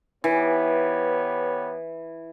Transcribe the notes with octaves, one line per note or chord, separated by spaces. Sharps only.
E3 B3 G4 C#5